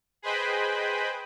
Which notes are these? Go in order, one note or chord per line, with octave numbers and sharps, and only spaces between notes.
G#4 B4 C5 D#5 G5 B5